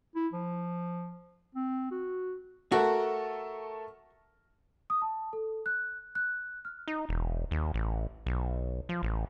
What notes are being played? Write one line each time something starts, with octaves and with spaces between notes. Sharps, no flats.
E4
F3
C4
F#4
A3 F#4 A4 A#4
D#6
A5
A4
F#6
F#6
F6
D#4
E1
D#2
A1
B1
F3
A1